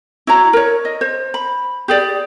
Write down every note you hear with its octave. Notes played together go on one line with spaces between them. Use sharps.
E4 F#4 C#5 A#5
A#4 C#5
D#5
C5
B5
G4 G#4 D5